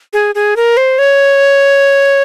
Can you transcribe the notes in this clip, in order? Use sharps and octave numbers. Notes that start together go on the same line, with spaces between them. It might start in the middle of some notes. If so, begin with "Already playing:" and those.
G#4
G#4
A#4
C5
C#5